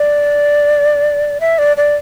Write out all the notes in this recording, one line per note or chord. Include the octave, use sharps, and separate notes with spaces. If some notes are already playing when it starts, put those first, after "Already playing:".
Already playing: D5
E5
D5
D5